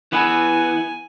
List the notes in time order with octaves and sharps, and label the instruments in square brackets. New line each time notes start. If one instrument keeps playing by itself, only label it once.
[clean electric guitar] E3 B3 E4 [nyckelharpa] G#5